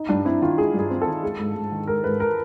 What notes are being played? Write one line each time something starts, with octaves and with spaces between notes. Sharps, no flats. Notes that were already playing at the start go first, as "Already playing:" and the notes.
Already playing: D#4
G2 D4
C4 E4
D#3 F4
G#3 G#4
G2
G#4
C4
A4
D#3
G#3
G#2
G#2
D#3
G#3 A#4
G#2 B4
A#4